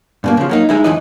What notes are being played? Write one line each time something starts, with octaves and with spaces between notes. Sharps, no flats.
G2 B2 A#3
C#3 F3
F#3 A#3 D#4
G#3 D#4 E4
B1 F2 E3 B4 D#5